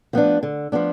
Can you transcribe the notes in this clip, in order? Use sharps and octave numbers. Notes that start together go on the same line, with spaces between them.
F3 B3 D4
D3
F3 B3 D4